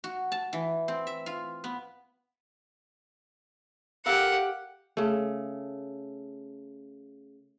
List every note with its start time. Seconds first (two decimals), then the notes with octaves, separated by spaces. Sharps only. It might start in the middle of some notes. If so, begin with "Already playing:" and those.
0.04 F#4
0.32 A5
0.53 E3
0.88 C4
1.07 E5
1.26 F4
1.64 B3
4.06 G4 A4 A#4 F5 F#5
4.97 C#3 A3